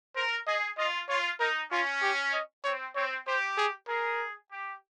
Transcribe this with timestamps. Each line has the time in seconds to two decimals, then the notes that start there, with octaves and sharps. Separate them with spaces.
0.15 A#4 C5
0.47 G#4 D#5
0.77 F4 D#5
1.09 F4 C#5
1.40 D#4 A#4
1.71 C#4 F4
2.02 G4
2.33 D#5
2.64 C4 C#5
2.95 C4 C#5
3.27 G4 C5
3.58 G#4
3.88 G#4 A#4
4.51 G4